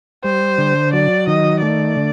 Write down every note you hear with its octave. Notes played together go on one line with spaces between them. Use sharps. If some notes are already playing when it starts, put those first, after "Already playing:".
G3 C5
D3
F#3 D5
D#3 D#5
A3 D5
D3